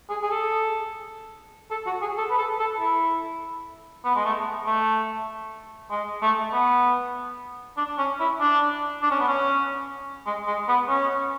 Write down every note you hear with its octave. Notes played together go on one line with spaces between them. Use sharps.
G#4
G#4
A4
A4
F#4
G#4
A4
B4
A4
A4
E4
B3
G#3
A3
A3
G#3
A3
B3
D4
C#4
E4
D4
D4
C#4
B3
C#4
G#3
G#3
B3
C#4